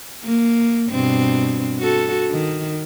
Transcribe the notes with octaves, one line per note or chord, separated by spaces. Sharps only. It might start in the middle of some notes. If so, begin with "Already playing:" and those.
A#3
G2 B2 C4
F#4 A4
D#3